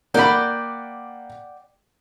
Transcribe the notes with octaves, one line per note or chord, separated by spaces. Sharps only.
A#3 D5 F#5 G5 B5